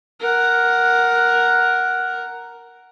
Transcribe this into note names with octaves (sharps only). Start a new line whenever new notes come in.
A#4 F#5